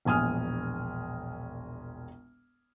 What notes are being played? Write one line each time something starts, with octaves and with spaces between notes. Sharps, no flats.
E1 A#1 G#5 D#6 F6